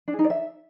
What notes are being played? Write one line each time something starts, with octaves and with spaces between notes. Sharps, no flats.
D4
G#4
D#4
D5
E5